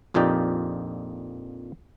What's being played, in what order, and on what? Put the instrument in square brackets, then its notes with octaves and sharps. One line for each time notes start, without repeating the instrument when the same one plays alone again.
[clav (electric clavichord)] A#1 F2 A#2 D#4 G4 D5